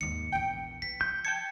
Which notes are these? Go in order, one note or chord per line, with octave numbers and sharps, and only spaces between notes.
D#2 G#2 C#7
A#1 E2 G5
E3 B6
F3 G6
G5 A5 G#6 C#7